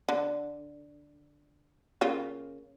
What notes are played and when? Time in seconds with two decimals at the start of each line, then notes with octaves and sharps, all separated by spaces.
0.09 D3
2.01 C#3 A#3 F4